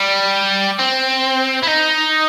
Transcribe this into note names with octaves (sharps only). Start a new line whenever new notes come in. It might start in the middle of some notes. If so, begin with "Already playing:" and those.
Already playing: G3
C4
E4
D#4